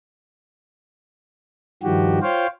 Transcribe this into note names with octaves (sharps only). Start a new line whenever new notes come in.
G2 D#3 F3 F#4 G4
F4 C5 C#5 F5 G5